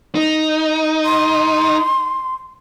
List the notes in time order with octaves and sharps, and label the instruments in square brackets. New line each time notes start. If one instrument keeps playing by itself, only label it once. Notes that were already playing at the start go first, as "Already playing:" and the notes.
[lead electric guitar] D#4
[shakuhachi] C6